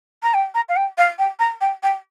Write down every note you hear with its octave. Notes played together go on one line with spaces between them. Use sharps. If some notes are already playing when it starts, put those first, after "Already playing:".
A#5
G5
A#5
F5
G5
F5
G5
A#5
G5
G5